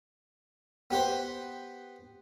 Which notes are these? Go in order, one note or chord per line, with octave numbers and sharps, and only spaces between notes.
B3 G4 B4 C5